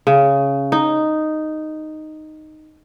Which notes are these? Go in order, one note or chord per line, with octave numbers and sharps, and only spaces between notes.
C#3
D#4